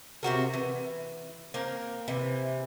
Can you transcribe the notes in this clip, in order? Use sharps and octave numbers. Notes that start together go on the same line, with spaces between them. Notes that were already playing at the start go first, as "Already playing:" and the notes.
C3 C4 F#4 A#4
E3
A#3 C4 A#4
C3 E3